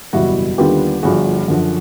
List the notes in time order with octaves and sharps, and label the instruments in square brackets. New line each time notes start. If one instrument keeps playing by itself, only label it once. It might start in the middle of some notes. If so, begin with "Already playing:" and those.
[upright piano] F#1 E2 B2 G3 E4 F#4
D#2 D3 G3 B3 F4 G4
G1 G2 D3 F3 F#4 G#4
F#2 D3 F3